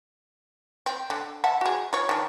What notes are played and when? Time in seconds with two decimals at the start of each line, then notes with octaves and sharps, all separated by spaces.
0.86 C4
1.10 D3
1.44 E5 F#5 A5
1.61 F#4 G#4
1.93 F4 C#5
2.09 D#3 D4